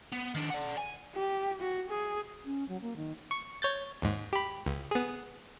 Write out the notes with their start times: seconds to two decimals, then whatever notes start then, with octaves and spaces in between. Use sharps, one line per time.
0.12 B3
0.35 D#3 D4
0.50 D5 F#5
0.77 G#5
1.15 G4
1.61 F#4
1.90 G#4
2.45 C#4
2.68 F#3
2.82 A#3
2.96 D#3
3.31 C#6
3.62 C#5 G6 A6
4.02 D#2 G#2
4.33 G4 B5
4.66 C#2
4.91 B3 G#4